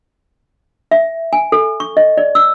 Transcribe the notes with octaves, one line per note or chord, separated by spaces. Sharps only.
E5
G#5
A4
C#6
D#5
D5
E6